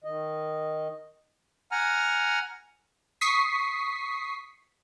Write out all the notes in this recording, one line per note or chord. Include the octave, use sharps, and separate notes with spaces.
D#3 D#5
F#5 G#5 A#5 F6
C#6 D#6 B6 C7